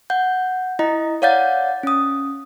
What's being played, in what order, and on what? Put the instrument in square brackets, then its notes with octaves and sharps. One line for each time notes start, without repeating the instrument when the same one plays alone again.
[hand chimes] F#5 G6
E4 D#5 A#5
C#5 D5 F5 F#5 G6 A6
C#4 D#6